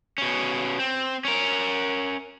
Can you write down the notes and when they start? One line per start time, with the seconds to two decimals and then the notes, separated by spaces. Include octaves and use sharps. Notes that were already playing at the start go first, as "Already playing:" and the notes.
0.18 B2 C#4
0.79 C4
1.25 C#4 A#4